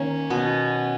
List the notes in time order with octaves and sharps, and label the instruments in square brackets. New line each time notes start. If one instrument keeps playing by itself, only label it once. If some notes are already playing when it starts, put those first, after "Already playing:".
Already playing: [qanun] D#3 A#3 [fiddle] C#4
[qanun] B2 B3